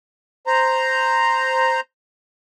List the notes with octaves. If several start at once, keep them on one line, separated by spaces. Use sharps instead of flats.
C5 A#5